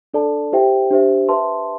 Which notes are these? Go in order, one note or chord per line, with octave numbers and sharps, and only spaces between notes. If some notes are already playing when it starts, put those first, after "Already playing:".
D4 A4 D5 A5
E4 G4 C5 E5 G5
D4 G4 C5 E5
B4 E5 A5 C6